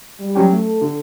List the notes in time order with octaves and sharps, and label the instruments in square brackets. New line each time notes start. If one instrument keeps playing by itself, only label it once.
[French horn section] G3
[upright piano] F#3 C#4 G4
[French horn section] A3
[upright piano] D3